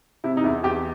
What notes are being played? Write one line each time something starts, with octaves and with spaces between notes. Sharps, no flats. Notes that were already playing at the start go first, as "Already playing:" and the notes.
C3 E4
D#4
E2 E4
E2 G4